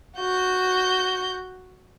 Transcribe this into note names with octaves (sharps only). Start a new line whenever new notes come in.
F#4 G6